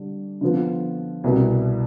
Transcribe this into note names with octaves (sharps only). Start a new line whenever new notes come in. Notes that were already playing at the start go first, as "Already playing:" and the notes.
Already playing: D3 G3 D4
D3 F3 B3 F4
C2 B2 B3 E4